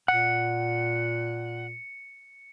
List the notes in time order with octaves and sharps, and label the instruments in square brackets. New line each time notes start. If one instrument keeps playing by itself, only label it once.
[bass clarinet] A#2 [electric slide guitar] F#5 [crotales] C#7